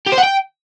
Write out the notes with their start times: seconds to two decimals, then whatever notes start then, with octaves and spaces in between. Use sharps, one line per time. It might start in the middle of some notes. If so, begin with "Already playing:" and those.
0.06 G4
0.12 C5
0.18 F#5
0.23 G5